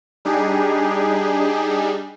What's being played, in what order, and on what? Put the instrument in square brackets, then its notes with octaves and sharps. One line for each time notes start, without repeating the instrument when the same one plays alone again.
[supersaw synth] G3 D4 D#4 G4 G#4